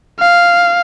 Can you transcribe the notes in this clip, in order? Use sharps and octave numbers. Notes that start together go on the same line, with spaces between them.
F5